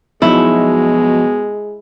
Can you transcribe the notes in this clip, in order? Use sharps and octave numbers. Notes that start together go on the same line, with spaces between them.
B2 F3 F#3 G#3 D#4 E4